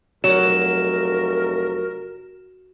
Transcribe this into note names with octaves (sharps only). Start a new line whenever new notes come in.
F1 F#3 A#4 E7